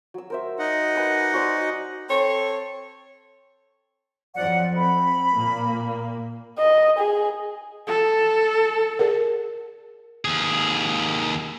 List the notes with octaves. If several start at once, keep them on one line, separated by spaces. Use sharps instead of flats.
F#3 E6
A#4 C5 E5
D#4 D#5 F#5
B4 G#5 D6
F#4 C5 D5
C4 A4 C5 C#5
F2 F3 F#3 D5 F#5
C4 B5
A#2 A#3
D#5
G#4
A4
G#4 A#4
D#2 G#4